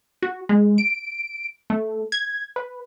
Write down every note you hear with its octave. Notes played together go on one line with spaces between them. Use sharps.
F#4
G#3
D7
A3
G#6
B4